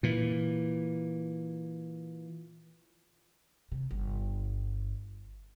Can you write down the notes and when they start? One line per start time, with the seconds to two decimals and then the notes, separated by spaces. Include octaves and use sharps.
0.03 A#2 E3
3.72 C3
3.91 G1